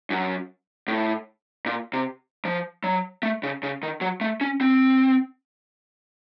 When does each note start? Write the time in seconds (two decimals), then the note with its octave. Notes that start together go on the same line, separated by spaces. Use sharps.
0.10 F#2
0.88 A2
1.66 A#2
1.93 C3
2.45 F3
2.84 F#3
3.23 A3
3.43 C#3
3.63 C#3
3.83 D#3
4.01 F#3
4.21 A3
4.41 C#4
4.61 C4